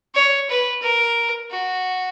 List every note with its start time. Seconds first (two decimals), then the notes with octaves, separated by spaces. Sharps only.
0.15 C#5
0.49 B4
0.82 A#4
1.51 F#4